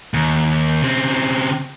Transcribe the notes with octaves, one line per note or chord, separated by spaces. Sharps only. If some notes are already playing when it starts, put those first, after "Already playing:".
D#2
C#3 C4